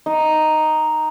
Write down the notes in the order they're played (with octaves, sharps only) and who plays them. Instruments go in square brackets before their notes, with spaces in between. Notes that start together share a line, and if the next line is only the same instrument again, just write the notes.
[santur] D#4